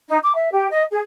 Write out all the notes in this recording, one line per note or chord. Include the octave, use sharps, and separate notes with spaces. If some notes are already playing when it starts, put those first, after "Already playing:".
D#4
D6
E5
G4
D#5
G#4